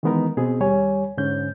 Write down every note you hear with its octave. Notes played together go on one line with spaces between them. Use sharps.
D#3 E3 G#3 B3 D#4 A#4
B2 B3 C4 G#4
D#2 G3 C#5 G#5
G#2 D3 C#4 G6